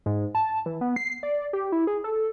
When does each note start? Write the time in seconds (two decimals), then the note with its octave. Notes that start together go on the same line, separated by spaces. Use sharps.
0.06 G#2
0.35 A5
0.66 E3
0.81 B3
0.96 C7
1.23 D5
1.53 G4
1.72 E4
1.87 G#4
2.04 A4